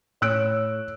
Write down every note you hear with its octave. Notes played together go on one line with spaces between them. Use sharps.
A2 C#5 E6 F#6 D7